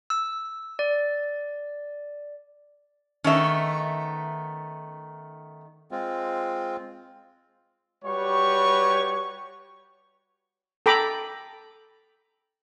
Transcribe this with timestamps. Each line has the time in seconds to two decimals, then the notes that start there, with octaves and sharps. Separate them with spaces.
0.10 E6
0.79 D5
3.24 D#3 A3 B3 C#4 E5
5.91 G#3 C4 F4
8.04 G3 F#4 G4 B4 C#5 C#6
10.86 A4 G5 A#5 B5 D6